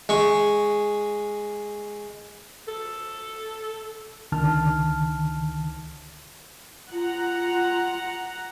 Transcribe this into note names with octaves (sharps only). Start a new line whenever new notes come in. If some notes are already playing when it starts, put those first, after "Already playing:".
G#3 C#6
A4
C#2 D3 D#3 A5 F6
F4 F#5 A#5